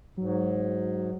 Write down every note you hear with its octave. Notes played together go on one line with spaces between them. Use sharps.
G#2 F#3